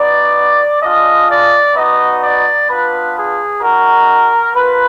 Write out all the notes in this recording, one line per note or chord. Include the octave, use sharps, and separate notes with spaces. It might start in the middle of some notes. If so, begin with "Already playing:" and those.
Already playing: B3 D#4 F#4 D5
G#3 D4 F4 D#5
D5
B3 D#4 F#4 D#5
D5
B3 D4 F4 B4
G#4
G#3 D#4 F#4 A#4
A#3 F4 B4